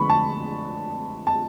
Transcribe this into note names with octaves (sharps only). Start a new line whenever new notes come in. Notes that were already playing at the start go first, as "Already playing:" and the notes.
Already playing: D3 F3 G#3 B3 B5 C#6
A5
A5